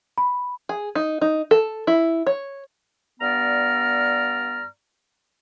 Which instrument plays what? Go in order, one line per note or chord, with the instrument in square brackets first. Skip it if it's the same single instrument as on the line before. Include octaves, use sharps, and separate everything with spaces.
[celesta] B5
[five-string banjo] G#4
D#4
D#4
A4
E4
C#5
[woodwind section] G2 B3 D5 A#5 F6